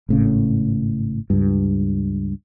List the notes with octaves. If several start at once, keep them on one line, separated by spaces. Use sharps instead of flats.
G#1 A2 C#3
C#2 G2